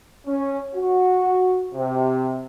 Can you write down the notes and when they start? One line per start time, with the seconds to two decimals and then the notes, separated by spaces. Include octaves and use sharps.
0.26 C#4
0.75 F#4
1.73 C3